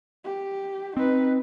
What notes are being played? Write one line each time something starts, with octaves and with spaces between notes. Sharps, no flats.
G4
C4 D#4 B4